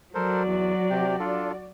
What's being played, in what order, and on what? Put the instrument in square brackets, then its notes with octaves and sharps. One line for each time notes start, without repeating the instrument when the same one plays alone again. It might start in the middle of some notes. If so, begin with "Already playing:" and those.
[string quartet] F#3 [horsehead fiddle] F#4 D5 [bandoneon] A4 A#4 C5
[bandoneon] E2
C3 G4
D4 F4 A4